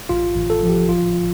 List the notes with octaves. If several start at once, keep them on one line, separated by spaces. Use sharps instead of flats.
A1 F4
A1
A4
F3
G4
G1 F4